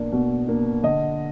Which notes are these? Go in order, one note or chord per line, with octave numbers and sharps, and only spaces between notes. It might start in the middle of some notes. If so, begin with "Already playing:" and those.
Already playing: B2 A#3 D4
B2
A#3 D4
D3 D#5